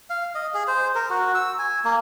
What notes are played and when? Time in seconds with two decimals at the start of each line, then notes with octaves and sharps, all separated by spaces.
0.10 F5
0.35 D#5
0.54 G#4
0.68 C5
0.95 A#4
1.10 F#4
1.35 E6
1.59 G#5
1.84 A#3